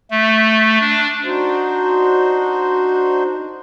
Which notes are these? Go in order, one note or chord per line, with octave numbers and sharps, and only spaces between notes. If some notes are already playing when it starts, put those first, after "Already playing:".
A3
D4
D4 D#4 F#4 C5